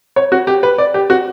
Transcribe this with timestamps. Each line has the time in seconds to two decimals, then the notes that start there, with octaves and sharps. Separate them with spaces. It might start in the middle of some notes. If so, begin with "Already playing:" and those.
0.16 C#5
0.32 F#4
0.47 G4
0.63 B4
0.78 D5
0.94 G4
1.10 F#4